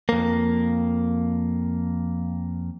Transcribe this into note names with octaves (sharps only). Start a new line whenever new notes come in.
F2 A#3